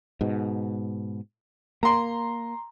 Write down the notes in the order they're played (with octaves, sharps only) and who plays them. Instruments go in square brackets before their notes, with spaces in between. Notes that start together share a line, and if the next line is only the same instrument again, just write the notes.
[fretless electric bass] G#2 B2
[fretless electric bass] A#3 [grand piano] A#5 C6